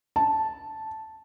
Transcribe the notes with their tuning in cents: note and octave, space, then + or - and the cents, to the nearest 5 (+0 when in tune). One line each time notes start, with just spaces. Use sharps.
A5 -5